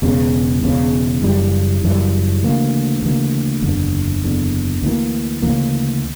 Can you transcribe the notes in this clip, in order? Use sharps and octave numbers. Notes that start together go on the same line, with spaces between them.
E1 E2 C#3
E1 E2 C#3
F#1 F#2 E3 G3
F#1 F#2 E3 G3
D2 C#3 E3 A#3
D2 C#3 E3 A#3
F#1 E2 D3
F#1 E2 D3
D2 C#3 E3 A#3
D2 C#3 E3 A#3